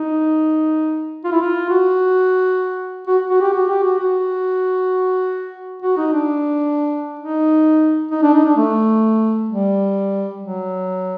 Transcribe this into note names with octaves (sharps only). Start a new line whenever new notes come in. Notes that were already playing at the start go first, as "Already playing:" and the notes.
Already playing: D#4
F4
E4
F4
F#4
F#4
F#4
G4
F#4
G4
F#4
F#4
F#4
D#4
D4
D#4
D#4
D4
D#4
D4
A3
G3
F#3